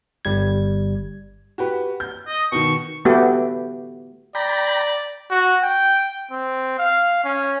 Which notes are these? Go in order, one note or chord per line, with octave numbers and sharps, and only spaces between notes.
G1 G3 G#6
F#4 G4 B4
G6
D#5
B2 D#3 C#6
A3 B3 F#4 G4
D5 G5 A#5 B5
F#4
G5
C4
F5
C#4